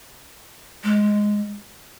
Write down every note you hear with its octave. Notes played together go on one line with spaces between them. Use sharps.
G#3